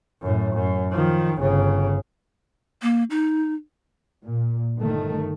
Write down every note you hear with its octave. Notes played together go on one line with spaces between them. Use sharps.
F#2 A2
F#2
D#3 F3
G1 C#3
A#3
D#4
A#2
G1 D#3 A3